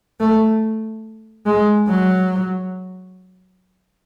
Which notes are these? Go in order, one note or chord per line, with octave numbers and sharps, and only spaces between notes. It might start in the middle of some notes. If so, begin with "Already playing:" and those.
A3
G#3
F#3